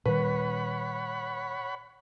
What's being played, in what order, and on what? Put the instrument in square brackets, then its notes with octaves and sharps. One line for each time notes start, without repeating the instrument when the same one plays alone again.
[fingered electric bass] A#2 D#3 G3 [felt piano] B4 [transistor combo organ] C#5 F#5 B5